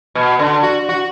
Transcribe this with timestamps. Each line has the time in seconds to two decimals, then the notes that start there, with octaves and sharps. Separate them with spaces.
0.15 B2
0.39 D3
0.63 F#4
0.89 F#4